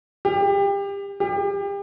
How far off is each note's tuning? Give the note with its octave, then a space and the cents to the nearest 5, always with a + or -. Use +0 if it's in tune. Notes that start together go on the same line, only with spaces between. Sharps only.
G4 +25
G4 +30